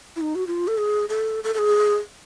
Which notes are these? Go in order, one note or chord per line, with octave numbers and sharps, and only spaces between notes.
E4
D#4
F#4
F4
A4
G#4
A4
A4
A4
G#4